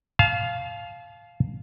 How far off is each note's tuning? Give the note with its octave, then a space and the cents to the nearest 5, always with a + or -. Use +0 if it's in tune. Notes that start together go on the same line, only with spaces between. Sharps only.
F5 +0 A5 -35